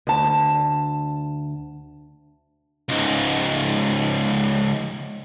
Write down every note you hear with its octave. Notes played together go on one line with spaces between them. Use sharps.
D2 A5
C#2 G#2